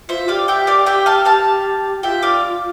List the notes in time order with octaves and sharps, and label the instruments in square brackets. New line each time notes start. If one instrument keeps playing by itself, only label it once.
[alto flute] F4 [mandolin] C5 E5
[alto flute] G4 [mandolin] D5 F5
[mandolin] E5 G5
D5 F5
E5 G5
F5 A5
F5 A5
[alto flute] F4 [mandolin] E5 G5
[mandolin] D5 F5